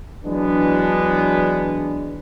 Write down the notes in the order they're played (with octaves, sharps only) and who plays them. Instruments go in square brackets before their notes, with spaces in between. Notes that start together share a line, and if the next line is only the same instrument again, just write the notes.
[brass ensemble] E3 F#3 G#3 B3 D4